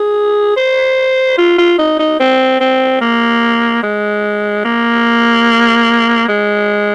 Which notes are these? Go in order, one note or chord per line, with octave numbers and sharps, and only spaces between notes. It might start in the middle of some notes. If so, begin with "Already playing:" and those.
Already playing: G#4
C5
F4
F4
D#4
D#4
C4
C4
A#3
G#3
A#3
G#3